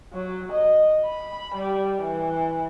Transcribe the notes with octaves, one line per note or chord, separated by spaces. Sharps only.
F#3
D#5
B5
G3
E3